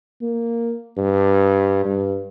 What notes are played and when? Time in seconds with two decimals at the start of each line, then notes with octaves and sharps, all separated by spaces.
0.22 A#3
0.97 G2
1.85 G2